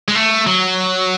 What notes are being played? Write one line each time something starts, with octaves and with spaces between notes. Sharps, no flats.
G#3
A3
F#3